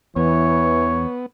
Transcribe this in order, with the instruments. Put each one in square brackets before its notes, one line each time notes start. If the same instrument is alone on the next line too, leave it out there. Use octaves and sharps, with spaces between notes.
[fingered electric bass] E2 [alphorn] E3 [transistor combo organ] B3 [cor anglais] C#5